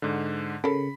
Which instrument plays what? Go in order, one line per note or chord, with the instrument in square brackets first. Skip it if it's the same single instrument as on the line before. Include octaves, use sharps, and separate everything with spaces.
[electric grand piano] G#2 D3
[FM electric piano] C#3 [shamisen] A4 A#4 [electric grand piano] B5